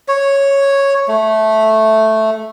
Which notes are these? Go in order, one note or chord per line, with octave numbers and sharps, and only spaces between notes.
C#5
A3